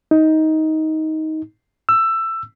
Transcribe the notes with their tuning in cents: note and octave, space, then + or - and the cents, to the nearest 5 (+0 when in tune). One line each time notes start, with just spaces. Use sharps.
D#4 +15
E6 +15